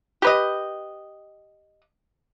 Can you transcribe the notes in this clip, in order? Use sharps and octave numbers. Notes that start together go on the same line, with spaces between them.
G4 B4 D#5